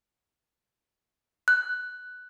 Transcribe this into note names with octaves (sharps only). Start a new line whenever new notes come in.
F#6